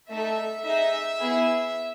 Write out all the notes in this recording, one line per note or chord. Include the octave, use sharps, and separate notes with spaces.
A3 D#4 A4 E5
D#4 G#4 E5
B3 E4 G#4